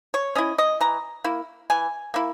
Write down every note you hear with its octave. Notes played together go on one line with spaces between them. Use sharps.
C#5
C#4 E4 D#5
D#5
E3 A#5
A#3 E4
E3 G#5
A#3 E4